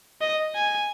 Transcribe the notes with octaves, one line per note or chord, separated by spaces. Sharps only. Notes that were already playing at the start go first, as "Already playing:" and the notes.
D#5
G#5